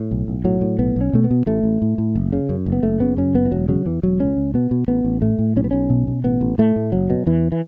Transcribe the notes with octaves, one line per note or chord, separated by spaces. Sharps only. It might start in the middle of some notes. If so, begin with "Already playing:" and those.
Already playing: A2
B1
B1
A2 F#3
A2
B1 B3
B1 C#4
B2 A3
B3
B2
A1 A3
A1
A2
A2
F#1
C#3
F#2
F#1
B3
F#1 A3
C#3 B3
F#2 C#4
F#1 B3
E3
E1 F#3
C#3 F#3
E2 E3
E1 F#3
C#2 C#4
C#2
B2 B3
B2
A1 B3
A1
A2 A3
A2
B1 C#4
B3
B1 C#4
B2
B2
A1 B3
A1
A2 A3
A2
F#1 F#3
B2
E2 E3
E3